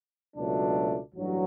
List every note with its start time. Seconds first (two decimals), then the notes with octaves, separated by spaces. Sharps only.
0.35 C#2 B2 F#3 A3 D4
1.15 A1 G2 F#3